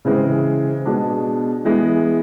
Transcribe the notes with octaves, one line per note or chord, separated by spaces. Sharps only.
C#3 E3 G#3 C4
B2 G#3 B3 D4
E3 G#3 B3